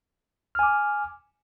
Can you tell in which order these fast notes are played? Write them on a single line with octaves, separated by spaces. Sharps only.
F6 G#5 D6